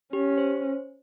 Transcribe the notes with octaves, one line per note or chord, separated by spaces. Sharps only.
C#4 G4
C5